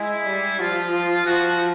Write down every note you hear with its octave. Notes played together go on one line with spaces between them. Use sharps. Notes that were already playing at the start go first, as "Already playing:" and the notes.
Already playing: G#3 E4
G3
F3 F4
F3 F#4